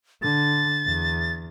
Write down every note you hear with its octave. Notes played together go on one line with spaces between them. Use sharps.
D3 A6
E2